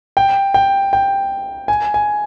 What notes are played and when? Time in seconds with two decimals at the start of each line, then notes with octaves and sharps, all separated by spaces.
0.17 G5
0.54 G5
0.93 G5
1.68 G#5
1.94 G#5